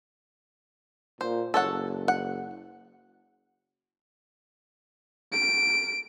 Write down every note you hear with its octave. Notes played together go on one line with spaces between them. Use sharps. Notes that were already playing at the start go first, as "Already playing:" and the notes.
A#2 C5
F#1 A4 C#5 F#5
F#5
D7